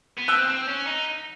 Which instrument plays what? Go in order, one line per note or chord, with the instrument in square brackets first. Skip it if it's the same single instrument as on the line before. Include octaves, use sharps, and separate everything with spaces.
[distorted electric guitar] B3
[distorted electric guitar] C4 [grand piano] E6 F#6
[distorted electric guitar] C4
C#4
D#4